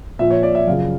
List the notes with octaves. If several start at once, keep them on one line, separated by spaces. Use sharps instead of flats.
A#2 F3 E5
C#5
D5
E5
F#2 C#3 F3 F5